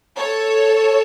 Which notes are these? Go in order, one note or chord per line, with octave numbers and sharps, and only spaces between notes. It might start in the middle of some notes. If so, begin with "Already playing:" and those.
A4 C#5